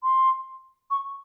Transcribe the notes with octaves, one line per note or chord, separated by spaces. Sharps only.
C6
C#6